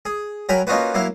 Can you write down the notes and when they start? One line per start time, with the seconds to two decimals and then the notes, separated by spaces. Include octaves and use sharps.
0.05 G#4
0.49 F#3 A#4 G5 G#5 B5
0.67 A#3 C#4 D#4 F4 F#4 B4
0.94 F#3 A#3 E4 F5